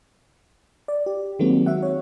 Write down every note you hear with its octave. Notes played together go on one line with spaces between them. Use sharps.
D5
G4
D#3 F#3 G#3 A#3 C4 F#4
F#4 E5 F#5
C#5